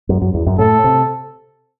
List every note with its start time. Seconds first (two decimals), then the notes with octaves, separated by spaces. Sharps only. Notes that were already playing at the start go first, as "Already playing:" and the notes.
0.09 F#2
0.22 F#2
0.34 E2
0.46 F#2
0.59 A2 A4
0.84 C3